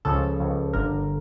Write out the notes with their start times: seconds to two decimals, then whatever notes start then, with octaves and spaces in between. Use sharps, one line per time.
0.05 C#2 C#3 F3 A4
0.39 C#2 C#3 F3
0.73 G1 G2 D3 A#4